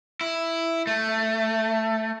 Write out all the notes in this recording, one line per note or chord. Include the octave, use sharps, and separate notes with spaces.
E4
A3